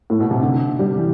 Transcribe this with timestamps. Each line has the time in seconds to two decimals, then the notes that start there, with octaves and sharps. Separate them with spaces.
0.10 A2
0.20 B2
0.31 C3
0.43 D3
0.79 G3
0.98 E3